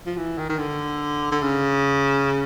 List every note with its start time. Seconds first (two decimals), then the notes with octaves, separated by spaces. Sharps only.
0.06 F3
0.17 E3
0.38 D#3
0.49 D#3
0.58 D3
1.31 D3
1.42 C#3